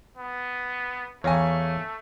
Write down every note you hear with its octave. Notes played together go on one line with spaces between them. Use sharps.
B3
E2 A3 C#5 F5 G#5 A#5